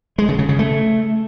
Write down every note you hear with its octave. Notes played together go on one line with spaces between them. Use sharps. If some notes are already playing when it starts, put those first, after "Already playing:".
G#3
C#3
C#3
C#3
A3